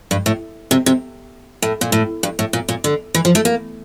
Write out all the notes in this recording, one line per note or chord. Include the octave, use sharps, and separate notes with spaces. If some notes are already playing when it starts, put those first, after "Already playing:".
G2
A2
C3
C3
A2
A#2
A2
G2
A2
A#2
A#2
D3
E3
F3
A3
A#3